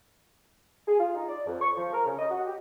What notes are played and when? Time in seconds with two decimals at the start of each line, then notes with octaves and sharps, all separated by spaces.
0.88 G#4
0.99 F4
1.15 D#4
1.29 D5
1.47 F2
1.61 C#6
1.77 F3
1.93 A#4
2.06 C#3
2.19 D#5
2.31 F#4
2.46 G4